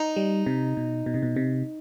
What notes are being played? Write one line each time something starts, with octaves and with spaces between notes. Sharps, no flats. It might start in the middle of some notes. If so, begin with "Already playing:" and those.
Already playing: D#4
G3
C3
B2
B2
C3
B2
C3